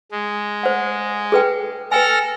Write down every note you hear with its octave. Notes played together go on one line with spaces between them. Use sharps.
G#3
C5 F#5
G#4 B4 G5
A4 B4 G5 G#5 F6 A#6